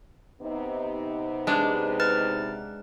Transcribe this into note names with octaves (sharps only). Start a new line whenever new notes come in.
C3 B3 D#4
G#3 D4
B4 F6 A6